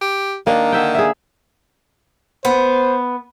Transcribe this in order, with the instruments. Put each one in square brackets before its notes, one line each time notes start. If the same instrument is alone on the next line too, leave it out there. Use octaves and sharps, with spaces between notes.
[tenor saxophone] G4
[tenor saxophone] D#3 [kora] A#3 D4
[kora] D3 E5 G5
G#4 E5
[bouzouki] B3 [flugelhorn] C5